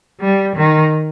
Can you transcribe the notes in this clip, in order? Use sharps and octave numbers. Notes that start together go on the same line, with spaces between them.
G3
D#3